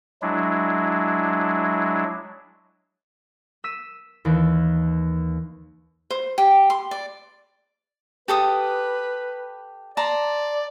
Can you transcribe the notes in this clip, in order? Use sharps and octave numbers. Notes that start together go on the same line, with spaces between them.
F#3 G#3 D4 E4
E6 B6 D#7
D#2 E3
C5
G4
C6
D5
G4 A4 B4 D#6
D5 A5 A#5 C6